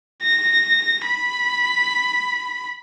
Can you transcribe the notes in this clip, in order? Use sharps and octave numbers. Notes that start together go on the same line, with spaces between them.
A#6
B5